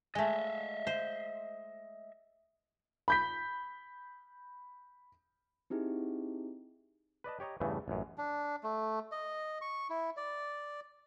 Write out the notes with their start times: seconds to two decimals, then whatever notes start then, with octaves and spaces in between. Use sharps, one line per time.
0.15 G#3 A3 D#5 E5
0.87 C5
3.08 B5 G6 B6
5.70 C4 D#4 E4 G4 G#4
7.24 B4 D5 D#5 A5
7.40 G4 C#5 D#5 A#5
7.60 E2 G2 C#3 E3 A3
7.88 A1 F#2
8.18 D4
8.64 A3
9.12 D#5
9.61 C#6
9.90 E4
10.17 D5